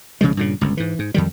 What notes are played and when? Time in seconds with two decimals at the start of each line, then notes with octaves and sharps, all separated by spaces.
0.21 C2 C#3 F3 G#3
0.37 G2 A#2 C#3
0.61 G1 C#2
0.77 G#2 E3
0.99 G#2
1.14 F2 D#3 G3